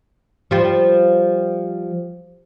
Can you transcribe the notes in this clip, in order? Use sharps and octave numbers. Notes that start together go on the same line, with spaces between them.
F3 G3 F4